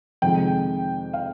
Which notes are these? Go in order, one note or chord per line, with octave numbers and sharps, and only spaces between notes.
F2 C3 D#3 G#3 G5
F5